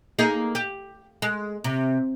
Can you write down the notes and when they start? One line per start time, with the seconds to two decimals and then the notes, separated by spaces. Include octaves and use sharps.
0.19 A#3 D#4 G#4
0.55 G4
1.22 G#3
1.64 C3